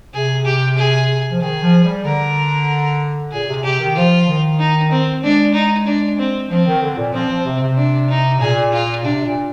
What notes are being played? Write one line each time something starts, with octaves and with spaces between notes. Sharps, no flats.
C3 G#4
G4
G#4
F3
D#3 G#4
F3
G3
D3 A#4
A#2 G#4
C3
C3 G4
D#3
F3 F4
D#3
D#4
C4
G#3 D4
D#4
D4
C4
F3 C4
D#3
D3
A#2
F3 C4
F3
C3
C3
D4
D#4
A#2 G#4
F4
C3 D4
A#2